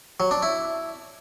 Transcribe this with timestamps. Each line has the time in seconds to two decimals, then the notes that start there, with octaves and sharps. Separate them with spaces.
0.20 F#3
0.31 D4
0.42 E4